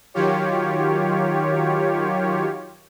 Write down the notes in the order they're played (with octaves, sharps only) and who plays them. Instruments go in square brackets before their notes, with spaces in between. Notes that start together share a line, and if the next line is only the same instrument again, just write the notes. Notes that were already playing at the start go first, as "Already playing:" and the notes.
[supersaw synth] D#3 F#3 F4 G4 C#5